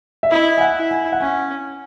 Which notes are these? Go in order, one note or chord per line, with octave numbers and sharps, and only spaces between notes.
E5
E4 D#5
G#5
F#5
E4
G#5
F#5
C#4 G#5